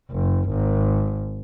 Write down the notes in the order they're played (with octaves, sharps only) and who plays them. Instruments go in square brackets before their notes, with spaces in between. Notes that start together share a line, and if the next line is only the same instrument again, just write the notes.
[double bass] F#1
G#1